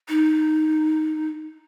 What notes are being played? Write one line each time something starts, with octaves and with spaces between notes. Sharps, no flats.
D#4